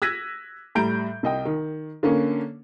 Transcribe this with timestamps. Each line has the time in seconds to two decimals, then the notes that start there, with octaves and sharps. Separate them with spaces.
0.02 E6 F#6 G#6 A#6 B6 D#7
0.75 A2 G3 A#5 G6 D7
1.23 C2 D#5 G5
1.45 D#3
2.03 D3 A#3 C#4